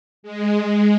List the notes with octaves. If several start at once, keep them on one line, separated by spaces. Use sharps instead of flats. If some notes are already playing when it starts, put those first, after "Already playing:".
G#3